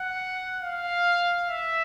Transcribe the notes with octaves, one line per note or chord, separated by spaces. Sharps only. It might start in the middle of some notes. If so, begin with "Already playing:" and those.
Already playing: F#5
F5
E5